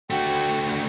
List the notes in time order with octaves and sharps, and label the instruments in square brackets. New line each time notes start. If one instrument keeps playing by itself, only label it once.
[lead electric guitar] D3 A3 [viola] F#4 [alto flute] G5